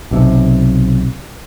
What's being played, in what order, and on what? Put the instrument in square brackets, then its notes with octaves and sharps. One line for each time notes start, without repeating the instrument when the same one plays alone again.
[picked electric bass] B1 C3